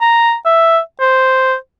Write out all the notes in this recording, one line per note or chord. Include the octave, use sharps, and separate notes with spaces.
A#5
E5
C5